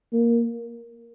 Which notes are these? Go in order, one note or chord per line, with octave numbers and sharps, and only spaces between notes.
A#3